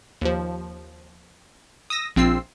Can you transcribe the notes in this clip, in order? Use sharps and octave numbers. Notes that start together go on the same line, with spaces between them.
D#2 F3
D#6 E6 A#6
A#1 C4 F4 E6 C7